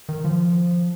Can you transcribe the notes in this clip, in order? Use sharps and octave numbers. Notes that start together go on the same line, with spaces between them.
D#3
F3